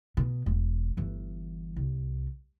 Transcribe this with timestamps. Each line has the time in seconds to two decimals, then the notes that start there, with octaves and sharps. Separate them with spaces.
0.17 B2
0.46 E1
0.97 G1 E3
1.76 C2